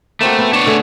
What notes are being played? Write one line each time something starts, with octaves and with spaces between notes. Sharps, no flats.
A3 A#3 C4 F#4
B3
D4 C#5
D3 A3 G#4